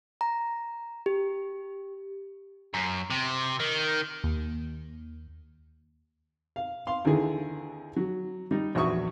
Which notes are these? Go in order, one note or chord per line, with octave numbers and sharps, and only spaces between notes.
A#5
G4
F#2
C3
D#3
D#2
F5
F5 C6
D#2 D3 E3 G#4
F#3
G3 D#4
A#1 E2 F#4 E5 C#6 D#6